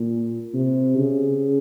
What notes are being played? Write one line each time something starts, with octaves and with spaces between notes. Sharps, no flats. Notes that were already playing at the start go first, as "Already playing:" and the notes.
Already playing: A#2
C3
C#3